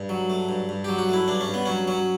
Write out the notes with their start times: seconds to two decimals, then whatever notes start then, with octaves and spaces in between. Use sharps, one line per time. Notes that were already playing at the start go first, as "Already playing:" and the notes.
Already playing: G2
0.09 F#3
0.30 A3
0.49 G2
0.69 G2
0.84 F#3 G4
0.98 F#4
1.09 A3 E4
1.28 G2 D4
1.41 C#4
1.48 G2
1.54 B3
1.65 F#3 C#4
1.87 F#3 C#4